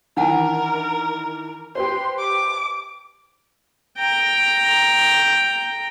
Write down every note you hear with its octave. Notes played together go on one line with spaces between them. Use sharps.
D#3 E3 D4 A#4 F#5 A5
G4 B4 C5 C6
D6
G5 A#5